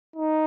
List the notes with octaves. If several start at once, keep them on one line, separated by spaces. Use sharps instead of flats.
D#4